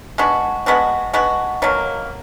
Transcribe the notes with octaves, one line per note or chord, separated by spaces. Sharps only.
G#3 B3 D4 F#4
G#3 B3 D4 F#4
G#3 B3 D4 F#4
B2 F#3 A#3